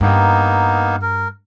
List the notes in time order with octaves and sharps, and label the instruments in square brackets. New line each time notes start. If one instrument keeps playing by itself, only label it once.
[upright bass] G2 [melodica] A#3 B3 D#4
[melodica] A#4